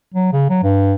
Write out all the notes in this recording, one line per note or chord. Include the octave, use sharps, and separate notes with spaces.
F#3
C#3
F#3
G2